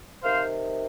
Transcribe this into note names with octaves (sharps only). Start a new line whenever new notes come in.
C3 D#3 C5 F5